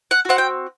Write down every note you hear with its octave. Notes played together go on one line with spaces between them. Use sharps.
F#5
C4 F#4 F#5
G5